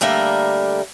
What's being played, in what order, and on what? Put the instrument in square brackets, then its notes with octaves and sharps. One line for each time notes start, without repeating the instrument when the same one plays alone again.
[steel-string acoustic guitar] D3 G3 A3 A#3 A#4